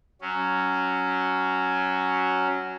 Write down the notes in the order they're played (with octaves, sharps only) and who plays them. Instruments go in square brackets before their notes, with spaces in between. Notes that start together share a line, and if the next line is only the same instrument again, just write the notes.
[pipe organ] F#3 C#4